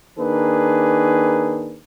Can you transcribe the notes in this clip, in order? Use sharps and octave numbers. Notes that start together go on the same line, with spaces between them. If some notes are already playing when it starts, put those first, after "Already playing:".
D#3 A#3 D4 G#4 B4